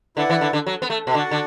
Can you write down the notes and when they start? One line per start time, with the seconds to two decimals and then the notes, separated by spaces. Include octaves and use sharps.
0.17 D3 E4 B4 D5 F#5
0.30 E3
0.41 D3
0.53 D3
0.67 F#3
0.82 B3
0.90 A3
1.07 B2
1.14 D3 D4 F#4 D5 F#5
1.31 D3